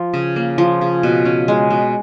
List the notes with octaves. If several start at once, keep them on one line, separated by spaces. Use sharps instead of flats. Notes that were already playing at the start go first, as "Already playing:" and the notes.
Already playing: F3
C#3
A#3
F3
C#3
B2
C#4
G#3
B2